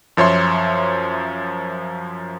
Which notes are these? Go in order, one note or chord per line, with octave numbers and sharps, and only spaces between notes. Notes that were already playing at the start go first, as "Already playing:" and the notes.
F#2 F3 C#5 E5 C6